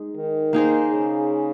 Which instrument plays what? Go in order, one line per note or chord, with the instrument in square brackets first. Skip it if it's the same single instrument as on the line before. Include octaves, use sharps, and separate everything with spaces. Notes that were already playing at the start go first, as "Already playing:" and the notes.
Already playing: [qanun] G#3 D#4
[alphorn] D#3
[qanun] A#3 D#4 G#4 C5
[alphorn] C#3